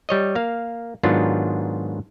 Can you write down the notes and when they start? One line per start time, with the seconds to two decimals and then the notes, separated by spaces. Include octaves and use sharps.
0.09 G3 C#5 D#5
0.35 A#3 F5
1.03 G#2 D#3 F#3 B3 D4 F4